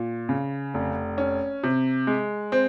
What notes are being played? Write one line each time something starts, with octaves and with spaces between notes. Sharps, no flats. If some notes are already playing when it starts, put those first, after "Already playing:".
Already playing: A#2
C#3
F1
C#4
C3
G#3
C4